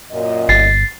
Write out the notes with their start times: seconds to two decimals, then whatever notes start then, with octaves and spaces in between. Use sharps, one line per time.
0.12 F#2 A#2 D#5
0.49 G1 A6 C7